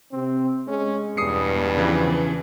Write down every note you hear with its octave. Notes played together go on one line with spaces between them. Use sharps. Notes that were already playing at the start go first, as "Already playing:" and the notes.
C3 C4
G#3 C#4 G#4
E2 G2 B2 D#6 C7 C#7
C#3 E3 F3